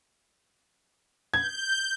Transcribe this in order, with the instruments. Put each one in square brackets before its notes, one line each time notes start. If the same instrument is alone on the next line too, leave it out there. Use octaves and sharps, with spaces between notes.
[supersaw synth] G6 [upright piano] G#6